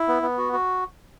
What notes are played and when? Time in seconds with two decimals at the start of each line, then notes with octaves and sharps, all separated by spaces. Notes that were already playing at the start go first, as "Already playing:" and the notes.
Already playing: E4
0.08 B3
0.22 B3
0.38 F#4
0.53 F#4